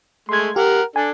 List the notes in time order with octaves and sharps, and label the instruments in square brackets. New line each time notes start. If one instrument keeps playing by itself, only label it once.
[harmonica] G#3 A3 [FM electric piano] C6 G#6
[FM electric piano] G4 [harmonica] A#4 F#5
[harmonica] D4 A4 [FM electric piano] G#5